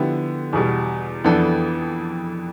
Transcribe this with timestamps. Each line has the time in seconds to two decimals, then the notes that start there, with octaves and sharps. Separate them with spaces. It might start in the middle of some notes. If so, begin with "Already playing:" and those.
Already playing: D3 F3 B3 E4 G4
0.53 E2 B2 G3
1.24 F2 E3 B3 D4 A4